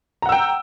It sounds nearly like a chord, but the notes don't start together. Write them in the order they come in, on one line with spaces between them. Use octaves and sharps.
A#5 F#5 E6 G5